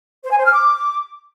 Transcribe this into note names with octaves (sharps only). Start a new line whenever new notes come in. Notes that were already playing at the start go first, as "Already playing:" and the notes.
C5
G#5
C5
F6
D6